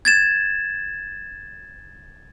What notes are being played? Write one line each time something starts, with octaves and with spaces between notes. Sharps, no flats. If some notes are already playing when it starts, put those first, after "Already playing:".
G#6 A6 E7